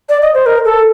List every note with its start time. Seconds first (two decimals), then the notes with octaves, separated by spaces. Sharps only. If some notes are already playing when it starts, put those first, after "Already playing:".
0.09 D5
0.22 D#5
0.34 C5
0.46 A#4
0.65 A4